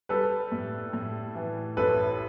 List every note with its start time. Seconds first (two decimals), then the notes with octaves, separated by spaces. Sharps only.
0.09 G3 A4 B4
0.52 A2
0.93 A2
1.35 E3
1.77 A1 A4 B4